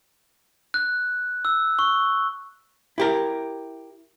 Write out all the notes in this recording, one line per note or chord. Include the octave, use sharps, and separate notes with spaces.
F#6
E6
C#6
E4 G4 A#4